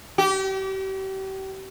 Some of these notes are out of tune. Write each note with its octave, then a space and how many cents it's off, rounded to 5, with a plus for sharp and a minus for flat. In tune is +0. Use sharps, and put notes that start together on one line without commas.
G4 -35